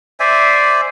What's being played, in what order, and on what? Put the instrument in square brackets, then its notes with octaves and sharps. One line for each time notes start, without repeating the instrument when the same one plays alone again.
[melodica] C5 D5 E5 G#5